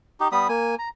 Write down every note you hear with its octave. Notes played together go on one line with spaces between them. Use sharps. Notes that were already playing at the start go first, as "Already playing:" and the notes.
D#4 G4
G3 B3 B5 D#6
A#3 G#5
A#5